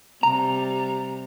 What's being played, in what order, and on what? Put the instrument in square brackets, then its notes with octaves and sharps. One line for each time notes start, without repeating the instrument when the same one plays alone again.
[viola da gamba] C3 G3 [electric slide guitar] A#5